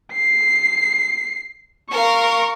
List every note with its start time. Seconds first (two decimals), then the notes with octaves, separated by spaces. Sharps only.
0.13 C7
1.90 A#4 F5 C#6